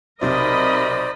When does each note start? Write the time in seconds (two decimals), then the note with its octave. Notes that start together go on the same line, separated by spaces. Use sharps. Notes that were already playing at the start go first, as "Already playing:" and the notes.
0.21 B1 C3 D#4 A#4 C5 D5 D#5 B5